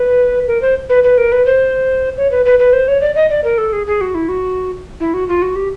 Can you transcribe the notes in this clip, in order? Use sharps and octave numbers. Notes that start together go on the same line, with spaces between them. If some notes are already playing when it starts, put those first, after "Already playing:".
Already playing: B4
A#4
C5
B4
B4
A#4
B4
C5
C#5
B4
B4
B4
C5
C#5
D5
D#5
D5
A#4
A4
G#4
G#4
F#4
E4
F#4
E4
F#4
F4
F#4
G4